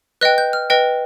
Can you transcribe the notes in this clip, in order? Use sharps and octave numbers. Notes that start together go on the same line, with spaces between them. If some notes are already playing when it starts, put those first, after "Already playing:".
B4 D#5 G5 F#6
G6
F6
B4 D#5 G5